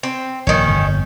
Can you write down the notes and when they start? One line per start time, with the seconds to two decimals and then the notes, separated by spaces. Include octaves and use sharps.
0.03 C4
0.47 A#1 G2 D#3 C#4
0.67 G1 F2